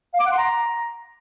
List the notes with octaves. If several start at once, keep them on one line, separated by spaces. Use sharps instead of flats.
F5
D6
F#5
C6
A#5